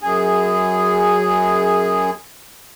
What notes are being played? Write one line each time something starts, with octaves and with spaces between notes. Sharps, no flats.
F#2 G#4